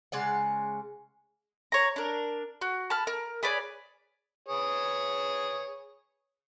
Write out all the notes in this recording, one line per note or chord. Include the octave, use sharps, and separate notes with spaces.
C#3 G#3 D5 F#5
C#5 A#5
D4 A#4
F#4
A5 B5 F6
A#4
G#4 B4 C#5 D5
G#4 B4 C#5